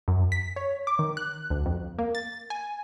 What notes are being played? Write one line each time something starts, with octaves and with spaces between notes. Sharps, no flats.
F#2
B6
C#5
D6
D#3
F#6
D2
F2
A#3
A6
G#5